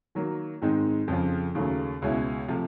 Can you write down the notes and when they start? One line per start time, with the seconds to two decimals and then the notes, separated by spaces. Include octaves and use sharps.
0.15 D#3 F#3 A#3
0.62 G#2 D#3 G#3 C4 D#4
1.08 F2 C#3 F3
1.55 D#2 C#3 F#3 A3
2.02 C#2 B2 G#3 C#4 E4
2.48 C3 F3 A3